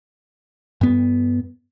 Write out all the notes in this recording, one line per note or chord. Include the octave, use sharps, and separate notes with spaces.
G2 B3